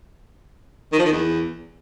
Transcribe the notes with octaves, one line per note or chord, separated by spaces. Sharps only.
D#3
F3
D#3
E2